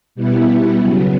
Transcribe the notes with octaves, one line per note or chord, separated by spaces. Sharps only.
B2 G3 B3 E4
C#3 F#3 B3